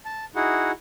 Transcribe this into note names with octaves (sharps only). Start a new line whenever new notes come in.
A5
D#4 E4 F#4 G#4 F#5